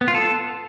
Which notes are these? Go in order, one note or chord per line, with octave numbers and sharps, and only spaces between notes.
B3
F4
A4